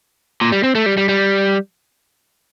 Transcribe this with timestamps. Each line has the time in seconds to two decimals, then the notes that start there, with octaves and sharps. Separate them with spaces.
0.41 A#2
0.52 G3
0.64 C4
0.75 A3
0.86 G3
0.97 G3
1.09 G3